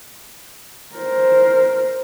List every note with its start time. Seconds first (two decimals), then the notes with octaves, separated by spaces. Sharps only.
0.95 A#4 C5